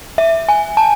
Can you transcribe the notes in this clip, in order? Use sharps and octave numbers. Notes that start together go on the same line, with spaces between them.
E5
G#5
A5